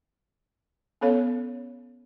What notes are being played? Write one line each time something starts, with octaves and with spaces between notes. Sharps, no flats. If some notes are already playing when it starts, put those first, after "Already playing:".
B3 C#4 A4 C#5 F5